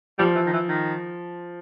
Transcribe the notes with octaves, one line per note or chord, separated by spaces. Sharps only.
F3 G3
E3
D#3
E3
D#3